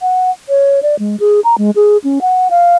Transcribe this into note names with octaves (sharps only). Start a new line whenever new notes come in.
F#5
C#5
D5
G#3
G#4
A#5
G#3
G#4
C#4
F#5
F5